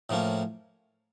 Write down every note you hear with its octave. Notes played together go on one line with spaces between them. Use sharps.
A2 F3 A#3 C#4